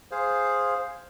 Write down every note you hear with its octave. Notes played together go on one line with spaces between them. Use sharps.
G#4 C5 F5